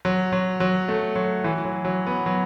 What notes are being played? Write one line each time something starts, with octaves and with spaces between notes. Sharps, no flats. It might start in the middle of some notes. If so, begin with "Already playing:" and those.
F#3
F#3
F#3
A3
F#3
E3
F#3
F#3
B3
F#3